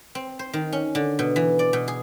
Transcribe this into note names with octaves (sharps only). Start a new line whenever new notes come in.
C4
C5
D#3
C#4
D3
B2
E3
D5
B2
G#4